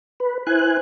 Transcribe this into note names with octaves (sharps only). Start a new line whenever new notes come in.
B4
E4 C5 G#5 F#6